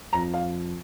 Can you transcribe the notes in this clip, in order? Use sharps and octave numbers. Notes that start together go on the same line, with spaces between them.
F2 F3 A#5
F5